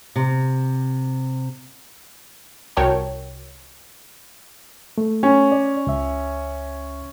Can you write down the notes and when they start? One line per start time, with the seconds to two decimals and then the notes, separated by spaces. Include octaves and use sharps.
0.16 C3
2.77 C2 F#4 A#4 C#5 G5 A5
4.98 A3
5.23 C#4
5.52 D5
5.87 C#2 E5